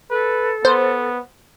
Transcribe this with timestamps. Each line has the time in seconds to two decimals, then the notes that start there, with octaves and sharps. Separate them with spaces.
0.10 A4 B4
0.65 B3 C5